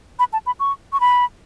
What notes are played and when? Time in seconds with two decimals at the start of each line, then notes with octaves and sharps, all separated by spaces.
0.19 B5
0.33 A5
0.46 B5
0.60 C#6
0.93 C#6
1.00 B5